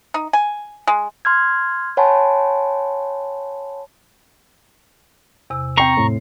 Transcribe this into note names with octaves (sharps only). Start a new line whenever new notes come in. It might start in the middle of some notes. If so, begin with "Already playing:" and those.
D#4
G#5
G#3
C6 F6 G#6
C#5 F#5 G#5 A5 B5 C6
E2 C3 E6
C4 G5 A#5 C#6 C7
A2